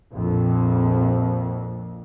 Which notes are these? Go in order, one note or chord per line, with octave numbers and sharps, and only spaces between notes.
A#1 F2